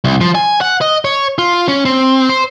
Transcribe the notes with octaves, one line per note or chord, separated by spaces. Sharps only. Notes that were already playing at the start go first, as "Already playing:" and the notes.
C2
F3
G#5
F#5
D#5
C#5
F4
C#4
C4
C5